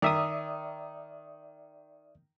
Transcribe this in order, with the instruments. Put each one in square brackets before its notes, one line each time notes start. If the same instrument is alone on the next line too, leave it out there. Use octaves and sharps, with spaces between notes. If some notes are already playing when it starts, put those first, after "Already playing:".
[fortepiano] D#3 [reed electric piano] D5 E5 D#6